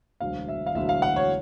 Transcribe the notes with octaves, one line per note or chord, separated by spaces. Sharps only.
E1 D2 D3 F#3 F5
E5
F5
E1 D2 D3 F#3 E5
F5
F#5
C#5